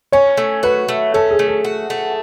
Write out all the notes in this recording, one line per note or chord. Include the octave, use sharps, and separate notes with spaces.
C#4 C#5
A3
F#4 B4
A3
C#4 A4
G#4
A3
A4
F#4
A3